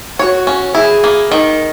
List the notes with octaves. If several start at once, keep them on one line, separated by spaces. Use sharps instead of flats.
F#4 C#5
C#4
E4 G#4
A#3
D#3 A#4